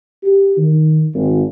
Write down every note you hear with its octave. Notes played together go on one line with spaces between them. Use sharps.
G4
D#3
G#1